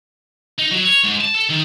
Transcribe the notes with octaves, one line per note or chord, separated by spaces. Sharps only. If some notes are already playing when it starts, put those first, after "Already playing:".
D#4
F#3
C#5
G#2
A5
A4
D#3